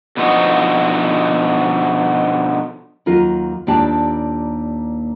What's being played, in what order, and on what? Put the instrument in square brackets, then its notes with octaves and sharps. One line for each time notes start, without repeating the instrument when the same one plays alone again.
[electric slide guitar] B2 D3 F3 D#4 F#4
[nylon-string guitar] D#2 F#3 F4 A#4
D#2 A#2 D4 G4 A5